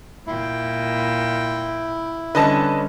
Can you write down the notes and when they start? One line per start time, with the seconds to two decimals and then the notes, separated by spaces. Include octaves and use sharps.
0.27 A#2 E4 G5
2.35 D3 G3 C#4 B4 D#5 A5